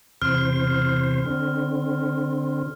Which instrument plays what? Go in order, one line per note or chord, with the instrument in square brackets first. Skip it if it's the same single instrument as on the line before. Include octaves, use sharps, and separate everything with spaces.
[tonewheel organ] E2 C3 C5 [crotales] F6
[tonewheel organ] D3 C4